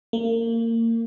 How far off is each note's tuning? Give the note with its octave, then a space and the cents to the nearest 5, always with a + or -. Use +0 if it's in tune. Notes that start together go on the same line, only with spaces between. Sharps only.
A#3 -30